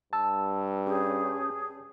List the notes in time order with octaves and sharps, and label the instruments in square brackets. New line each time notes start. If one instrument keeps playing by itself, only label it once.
[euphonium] G2 [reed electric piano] A5 E6
[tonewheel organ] C#4 G4 [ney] G#4